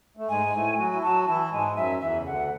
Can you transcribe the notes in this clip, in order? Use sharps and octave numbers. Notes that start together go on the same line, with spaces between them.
A3
G#2 G#3 G#5
G#3
A2 A3
F#3 F#4
E4
F#3 F#4 A5
E3 E4 A5
G#2 G#3 G#5
F#2 F#3 E5
E2 E3 E5
C#3
D2 D3 F#5